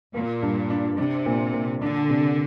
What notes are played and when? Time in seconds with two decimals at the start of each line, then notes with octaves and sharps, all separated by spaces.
0.14 A#2 A#3
0.42 G2
0.70 D4
0.98 C3 D4
1.26 A#2
1.54 A#2
1.82 D3 D4
2.10 C3